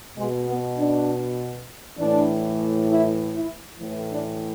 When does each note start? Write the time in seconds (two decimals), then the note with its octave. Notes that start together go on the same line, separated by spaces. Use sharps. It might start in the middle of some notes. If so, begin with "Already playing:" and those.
0.17 B2 G#3
0.48 B3
0.78 D4
1.98 A2 E3 D4
2.90 E4
3.35 E4
3.80 A2 E3
4.11 D4